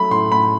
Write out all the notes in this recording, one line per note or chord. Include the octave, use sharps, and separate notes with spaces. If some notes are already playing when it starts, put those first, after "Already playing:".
Already playing: F#3 A3 B5
A2 C6
A2 B5